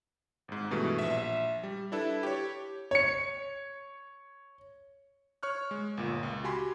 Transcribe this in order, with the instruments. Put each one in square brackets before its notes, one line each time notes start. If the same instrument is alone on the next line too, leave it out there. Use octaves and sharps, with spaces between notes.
[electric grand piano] G#1 G#2
G2 B2 E3 G#3 A3
A#1 E5
G3
D4 E4 A4 B4
G4 C#5
[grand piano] C#5 C#7
[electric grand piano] C#5 C#6 F6 F#6
G#3
G1 A#2
C#2
F#4 G4 G5 G#5 B5 C6